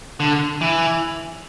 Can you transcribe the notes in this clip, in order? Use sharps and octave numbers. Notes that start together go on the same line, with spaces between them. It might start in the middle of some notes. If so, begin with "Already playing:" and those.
D3
E3